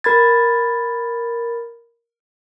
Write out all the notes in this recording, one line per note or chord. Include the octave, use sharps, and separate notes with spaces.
A#4 B5 G#6 A6